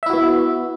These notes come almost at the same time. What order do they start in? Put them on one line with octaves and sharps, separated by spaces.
E5 E4 F#4 B3